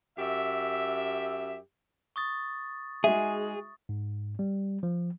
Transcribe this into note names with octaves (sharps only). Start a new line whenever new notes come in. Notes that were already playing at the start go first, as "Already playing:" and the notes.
F#2 G4 E5
C#6 D#6 A6
G#3 D#4 F#4 G#4 E5
G#2
G3
F3